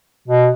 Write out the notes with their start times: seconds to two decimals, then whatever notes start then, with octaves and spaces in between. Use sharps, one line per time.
0.28 B2